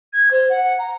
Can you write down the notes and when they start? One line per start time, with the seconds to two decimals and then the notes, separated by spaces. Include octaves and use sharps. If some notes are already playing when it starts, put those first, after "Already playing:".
0.13 G#6
0.31 C5
0.50 F#5
0.79 A#5